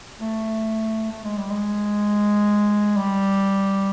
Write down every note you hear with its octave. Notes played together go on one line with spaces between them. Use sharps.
A3
A3
G#3
G3
G#3
G3